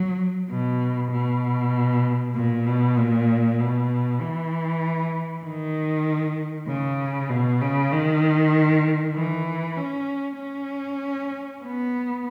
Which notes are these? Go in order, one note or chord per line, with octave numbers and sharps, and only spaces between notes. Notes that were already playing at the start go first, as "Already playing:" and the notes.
Already playing: F#3
B2
B2
A#2
B2
A#2
B2
E3
D#3
C#3
B2
C#3
D#3
E3
C#4
C#4
B3